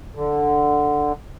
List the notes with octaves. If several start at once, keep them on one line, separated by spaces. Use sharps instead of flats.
D3